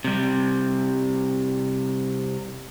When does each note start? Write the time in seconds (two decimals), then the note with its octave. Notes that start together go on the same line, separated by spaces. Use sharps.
0.05 C3 G3